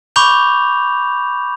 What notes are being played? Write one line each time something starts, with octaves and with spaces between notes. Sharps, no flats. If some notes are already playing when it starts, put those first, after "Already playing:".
B5 C#6 D6 G6 F7